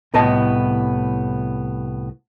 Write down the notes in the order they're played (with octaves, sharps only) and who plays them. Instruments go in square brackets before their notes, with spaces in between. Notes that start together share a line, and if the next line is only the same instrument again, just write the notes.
[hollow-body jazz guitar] C2 A2 B3 D#5 A5